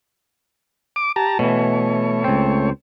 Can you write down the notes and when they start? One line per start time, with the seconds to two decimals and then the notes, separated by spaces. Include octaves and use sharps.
0.96 D6
1.16 G4 A5 A#5
1.39 B2 E3 A3 C#5
2.24 C#2 C4